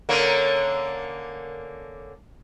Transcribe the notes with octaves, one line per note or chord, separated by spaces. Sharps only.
D3 A#3 C#4